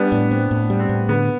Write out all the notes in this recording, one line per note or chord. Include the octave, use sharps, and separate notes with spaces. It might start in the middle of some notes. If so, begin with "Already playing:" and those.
Already playing: G3 B3 D4
A2
C4
A2
G3
C4
A2
D3 B3